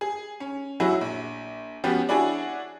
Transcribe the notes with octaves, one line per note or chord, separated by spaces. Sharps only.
G#4
C#4
F#3 E4 F#4 G#4
A#1
F3 B3 C#4 F#4 G4
D4 E4 F#4 G#4 C#5 G#5